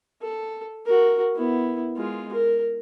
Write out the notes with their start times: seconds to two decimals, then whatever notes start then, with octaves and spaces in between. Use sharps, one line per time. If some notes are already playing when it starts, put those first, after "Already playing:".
0.22 A4
0.86 F#4 A#4
1.36 B3 E4
1.97 G#3 F4
2.33 A#4